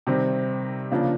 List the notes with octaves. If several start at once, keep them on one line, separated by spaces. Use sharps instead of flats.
C3 D#3 G3 C4
C#3 F3 A#3 D4